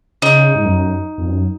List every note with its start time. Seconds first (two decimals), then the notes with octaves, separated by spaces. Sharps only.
0.22 C#3 D#4
0.55 G#2
0.65 F#2
1.18 F2
1.28 F#2